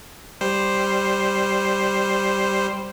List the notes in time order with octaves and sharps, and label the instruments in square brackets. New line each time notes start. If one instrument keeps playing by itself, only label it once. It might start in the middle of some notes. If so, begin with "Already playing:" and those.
[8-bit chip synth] G3 C5